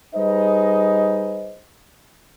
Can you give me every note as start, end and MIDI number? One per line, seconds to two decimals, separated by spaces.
0.15 1.57 55
0.15 1.57 63
0.15 1.57 68
0.15 1.57 71
0.15 1.57 72
0.15 1.57 75